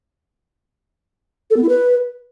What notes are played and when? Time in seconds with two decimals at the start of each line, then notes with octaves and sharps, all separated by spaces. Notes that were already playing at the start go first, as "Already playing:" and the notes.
1.50 A4
1.56 B3
1.62 E4
1.68 B4